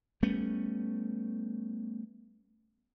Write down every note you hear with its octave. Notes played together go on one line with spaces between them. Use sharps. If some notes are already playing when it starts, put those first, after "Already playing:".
G3 A3 B3 C#4